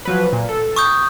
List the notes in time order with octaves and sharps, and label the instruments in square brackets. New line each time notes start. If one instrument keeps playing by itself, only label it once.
[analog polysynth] F3 F#3 B4
A#2
A4
[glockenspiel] C#6 D#6 G6